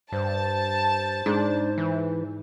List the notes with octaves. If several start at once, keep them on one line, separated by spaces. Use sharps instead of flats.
G2 C5 A5
G#2 D4
E3